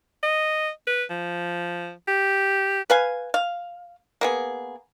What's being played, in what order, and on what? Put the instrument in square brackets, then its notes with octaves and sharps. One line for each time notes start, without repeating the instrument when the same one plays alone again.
[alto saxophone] D#5
B4
F3
G4
[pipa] B4 F5 G#5
F5
A#3 B3 G#4